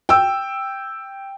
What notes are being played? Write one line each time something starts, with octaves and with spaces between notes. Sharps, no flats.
G5 E6